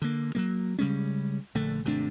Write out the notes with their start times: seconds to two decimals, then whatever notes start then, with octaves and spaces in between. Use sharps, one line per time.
0.02 D3 A#3
0.35 F#3 G#3 A#3
0.79 C#3 G3 G#3 C#4
1.55 A#1 D3 A3
1.85 G#1 C3 A3 D4